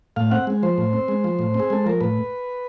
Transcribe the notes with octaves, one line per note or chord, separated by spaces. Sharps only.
A2 F5
C4 F#5
G#3
F3 C5
A2
C4
G#3
F3
A2
C4
G#4
G#3 A4
F3 A#4
A2 B4